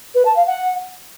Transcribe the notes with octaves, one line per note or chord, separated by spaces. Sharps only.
B4
A5
F5
F#5